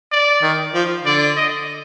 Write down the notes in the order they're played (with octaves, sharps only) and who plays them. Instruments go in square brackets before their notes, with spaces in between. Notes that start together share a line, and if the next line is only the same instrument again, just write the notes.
[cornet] D5
[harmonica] D#3
F3
[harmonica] D3 [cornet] D5
[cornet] D#5